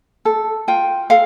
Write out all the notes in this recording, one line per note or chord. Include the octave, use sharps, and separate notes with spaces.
A4
F4 G5
A4 F5